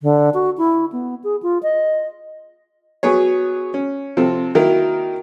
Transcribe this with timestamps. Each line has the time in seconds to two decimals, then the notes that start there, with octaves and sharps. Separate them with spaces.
0.02 D3
0.34 F#4
0.58 E4
0.92 B3
1.24 G#4
1.43 F4
1.63 D#5
3.03 F#3 B3 G#4 C#5
3.74 C#4
4.17 C3 F3 C4 A4
4.55 D#3 F#3 A#3 E4 A#4